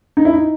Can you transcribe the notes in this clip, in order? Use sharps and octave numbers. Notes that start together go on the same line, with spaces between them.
D#4
E4
D#4